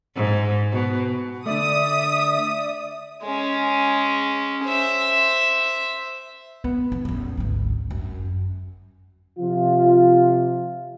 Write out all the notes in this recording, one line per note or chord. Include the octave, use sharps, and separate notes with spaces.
G#2
B2
D3 A3 D5 E5 D#6
G#3 C#4
C5 E5
B3
E3
A1 E2
G#1 D2
F#2
C3 F3 F4